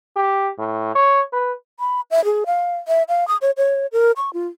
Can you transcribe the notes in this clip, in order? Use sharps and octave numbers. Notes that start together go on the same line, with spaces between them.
G4
A2
C#5
B4
B5
E5
G#4
F5
E5
F5
D#6
C#5
C#5
A#4
C#6
F4